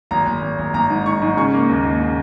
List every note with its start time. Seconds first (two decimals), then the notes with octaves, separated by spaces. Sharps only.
0.11 G#1 A#5
0.27 G#1
0.42 G#1
0.59 G#1
0.74 G#1 A#5
0.90 G#2
1.06 G#2 C#6
1.22 G#2
1.37 C#3 C#6
1.53 A#3
1.69 D#2
1.85 D#2
2.00 C#3